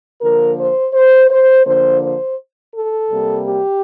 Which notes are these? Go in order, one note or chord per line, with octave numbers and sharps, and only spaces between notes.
D3 F3 A#3 A#4
C5
C5
C5
D3 F3 A#3 C5
C5
A4
C3 G3 A#3
G4